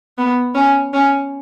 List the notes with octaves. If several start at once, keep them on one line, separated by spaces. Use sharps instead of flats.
B3
C#4
C#4